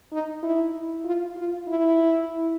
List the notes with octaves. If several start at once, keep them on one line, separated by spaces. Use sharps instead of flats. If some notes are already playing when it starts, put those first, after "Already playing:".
D#4
E4
F4
F4
E4